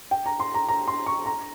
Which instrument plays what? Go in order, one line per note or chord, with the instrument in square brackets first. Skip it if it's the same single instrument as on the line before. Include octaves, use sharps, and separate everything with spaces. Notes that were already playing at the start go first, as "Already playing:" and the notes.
[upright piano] G5
A#5
C6
A#5
A#5
C6
C#6
A#5